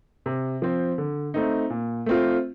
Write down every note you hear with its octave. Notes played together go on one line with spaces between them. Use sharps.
C3
F3 C4
D3
A3 C4 D#4
A#2
A3 C4 F4